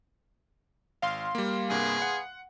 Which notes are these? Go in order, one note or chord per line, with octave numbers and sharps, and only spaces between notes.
G#1 F5 C6
G3 A#3
C2 G2 A#3 B3 G#4
F#5